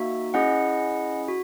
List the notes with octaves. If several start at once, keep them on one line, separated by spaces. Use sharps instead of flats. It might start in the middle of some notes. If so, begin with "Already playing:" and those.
Already playing: A#3 D#4 F#4 E5
C#4 E4 G#4 D#5 F#5
F#4